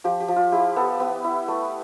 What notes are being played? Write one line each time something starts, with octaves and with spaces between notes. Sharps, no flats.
F3 G4
G4
F3
F4
E4 G4
B3 A4
B3
E4
A3